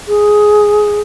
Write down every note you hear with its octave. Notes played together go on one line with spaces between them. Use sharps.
G#4